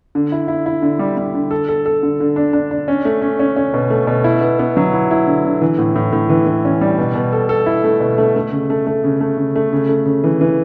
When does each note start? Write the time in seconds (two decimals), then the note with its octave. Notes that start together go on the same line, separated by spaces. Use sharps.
0.15 D3
0.32 E4
0.48 E4
0.66 E4
0.82 D3
0.99 G3
1.17 G3
1.34 D3
1.51 A4
1.69 A4
1.86 A4
2.03 D3
2.20 D3
2.36 D4
2.53 D4
2.71 D4
2.88 C#4
3.05 A3
3.22 C#4
3.39 C#4
3.56 C#4
3.74 B2
3.90 A3
4.07 B2
4.24 E4
4.41 B3
4.59 B3
4.77 F#3
4.93 E4
5.11 E4
5.27 D3
5.45 D3
5.62 E3
5.79 A2
5.96 A2
6.13 A2
6.29 E3
6.47 E3
6.65 C#4
6.81 G3
6.98 B2
7.15 B2
7.33 A4
7.49 A4
7.66 E4
7.84 A3
8.00 B2
8.18 A3
8.36 A3
8.52 C#3
8.70 A3
8.87 A3
9.04 C#3
9.21 A3
9.37 C#3
9.56 A3
9.73 C#3
9.89 A3
10.06 C#3
10.24 E3
10.41 E3